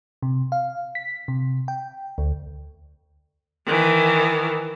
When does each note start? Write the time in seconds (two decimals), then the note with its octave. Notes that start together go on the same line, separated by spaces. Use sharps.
0.23 C3
0.52 F5
0.95 B6
1.28 C3
1.68 G5
2.18 D2
3.67 D#3 E3